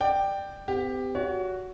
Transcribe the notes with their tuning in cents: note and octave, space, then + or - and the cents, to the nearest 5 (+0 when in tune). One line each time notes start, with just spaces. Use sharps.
D5 +20 G5 +0
C4 -45 G4 +10
F#4 +0 C#5 +35